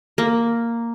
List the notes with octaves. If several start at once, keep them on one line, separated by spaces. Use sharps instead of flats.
A#3